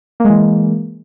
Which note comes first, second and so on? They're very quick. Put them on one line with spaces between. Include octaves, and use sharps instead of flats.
A#3 G#3 E3